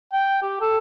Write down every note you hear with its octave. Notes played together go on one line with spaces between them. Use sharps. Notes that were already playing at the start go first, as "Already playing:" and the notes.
G5
G4
A4